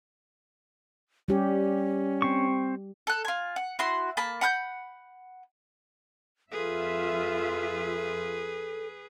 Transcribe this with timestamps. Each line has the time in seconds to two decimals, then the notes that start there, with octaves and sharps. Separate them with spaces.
1.28 G3 C#4 G4
2.22 C4 C#6
3.07 A4 F#6
3.25 F4 G#5
3.56 F#5
3.79 E4 F#4 C6
4.17 A#3 A5 B5
4.41 F#5 B5 F#6 G6
6.52 F2 F4 G#4 A4 B4 E5